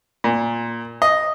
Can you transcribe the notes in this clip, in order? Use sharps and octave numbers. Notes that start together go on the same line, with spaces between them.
A#2
D#5